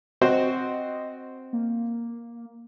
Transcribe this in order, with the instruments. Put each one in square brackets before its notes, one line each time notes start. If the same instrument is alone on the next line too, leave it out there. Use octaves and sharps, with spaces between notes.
[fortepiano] C4 F#4 C5 [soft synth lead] D#5
[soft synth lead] A#3